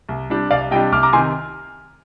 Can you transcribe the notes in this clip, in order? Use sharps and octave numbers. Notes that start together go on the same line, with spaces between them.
C2
C3 G3 D4
C2 D5 F5
C3 G3 D4 D#5 G5
C2 D6 F6
A#5 D6
C3 D#3 G#5 C6